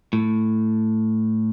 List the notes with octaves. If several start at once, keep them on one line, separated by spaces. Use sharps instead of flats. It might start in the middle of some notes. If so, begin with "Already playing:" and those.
A2